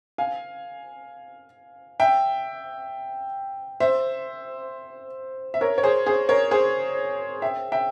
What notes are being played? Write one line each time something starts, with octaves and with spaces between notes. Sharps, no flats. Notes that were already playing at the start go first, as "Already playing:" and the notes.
F5 G#5
E5 G5
C5 E5
E5
A#4 C#5
C#5
G#4 C5
G#4 C5
A#4 C#5
G#4 C5
E5 G5
E5 G5